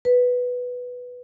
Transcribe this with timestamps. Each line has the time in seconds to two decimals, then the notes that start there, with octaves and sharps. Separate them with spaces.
0.05 B4